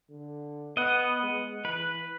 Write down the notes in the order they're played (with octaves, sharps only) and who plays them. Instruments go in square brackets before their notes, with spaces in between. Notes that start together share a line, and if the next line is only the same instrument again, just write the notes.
[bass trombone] D3
[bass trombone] B3 [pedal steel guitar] D#5 F#5
[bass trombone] G#3
[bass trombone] E3 [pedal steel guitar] B4